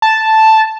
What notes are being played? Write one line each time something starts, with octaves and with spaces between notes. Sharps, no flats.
A5